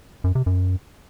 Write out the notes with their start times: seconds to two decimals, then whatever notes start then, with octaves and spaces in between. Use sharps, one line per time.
0.24 F#2
0.35 C3
0.46 F#2